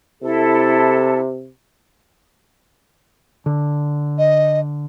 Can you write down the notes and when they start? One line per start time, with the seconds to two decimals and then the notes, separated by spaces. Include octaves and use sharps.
0.23 C3 E4 A4
3.46 D3
4.18 D#5